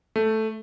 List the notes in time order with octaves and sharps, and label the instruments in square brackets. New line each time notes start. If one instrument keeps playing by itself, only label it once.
[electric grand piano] A3